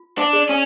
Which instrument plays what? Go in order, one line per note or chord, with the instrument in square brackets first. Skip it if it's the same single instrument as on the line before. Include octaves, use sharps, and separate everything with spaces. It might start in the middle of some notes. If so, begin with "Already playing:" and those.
Already playing: [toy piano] F4
[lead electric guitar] D4
[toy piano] G#4 D5
[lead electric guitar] C#4